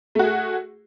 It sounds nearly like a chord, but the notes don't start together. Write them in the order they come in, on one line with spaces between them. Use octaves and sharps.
A3 F#4 G#4